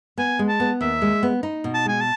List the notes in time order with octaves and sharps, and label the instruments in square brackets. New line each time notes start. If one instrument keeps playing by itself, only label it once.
[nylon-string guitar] B3 [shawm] G#5
[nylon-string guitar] G#3
[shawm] A5
[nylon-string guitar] B3
[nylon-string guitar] D#2 [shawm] E5
[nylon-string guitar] G#3
B3
D#4
B2
[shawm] A5
[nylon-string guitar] G#3 [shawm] G#5
[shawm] A5